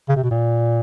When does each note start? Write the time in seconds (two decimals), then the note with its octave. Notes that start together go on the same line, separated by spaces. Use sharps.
0.09 C#3
0.16 C3
0.24 B2
0.31 A#2